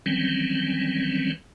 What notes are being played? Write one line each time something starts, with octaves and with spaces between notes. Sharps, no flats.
D#3 E3 F#3 G3 C4 C#4